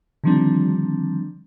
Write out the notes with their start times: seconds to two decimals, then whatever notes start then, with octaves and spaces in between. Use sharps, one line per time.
0.24 D3 D#3 F3 G3 C4 D4